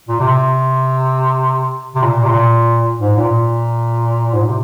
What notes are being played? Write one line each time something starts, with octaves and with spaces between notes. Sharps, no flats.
A#2
C3
C3
A#2
C3
A#2
G#2
A#2
G#2
A#2
C3